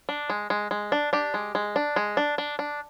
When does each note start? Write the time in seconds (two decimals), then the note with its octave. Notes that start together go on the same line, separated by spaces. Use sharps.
0.09 D4
0.30 G#3
0.50 G#3
0.71 G#3
0.92 D4
1.13 D4 G4
1.34 G#3
1.55 G#3
1.76 D4
1.96 G#3
2.17 D4
2.38 D4
2.59 D4